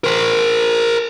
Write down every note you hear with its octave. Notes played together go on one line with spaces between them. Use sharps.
A#4 C5